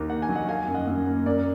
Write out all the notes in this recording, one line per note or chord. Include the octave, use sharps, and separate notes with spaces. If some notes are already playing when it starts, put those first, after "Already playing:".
Already playing: D#2 D#3 A#4
A#3 F#5
G#5
F#3
D#5 F#5
D#3 F5 G#5
F#2
D#5 F#5
F#2
A#3
F#2 A#4 D5